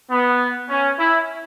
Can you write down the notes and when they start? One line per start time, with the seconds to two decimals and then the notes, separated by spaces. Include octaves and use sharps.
0.10 B3
0.69 C#4
0.98 E4